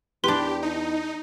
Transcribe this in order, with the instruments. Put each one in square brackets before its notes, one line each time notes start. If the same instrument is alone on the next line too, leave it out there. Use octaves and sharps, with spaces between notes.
[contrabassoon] E2 [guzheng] D4 B4 [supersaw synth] G4 [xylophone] C6
[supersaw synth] D#4